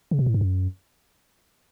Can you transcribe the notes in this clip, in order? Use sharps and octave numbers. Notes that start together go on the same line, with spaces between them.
C#3
B2
A2
G2
F#2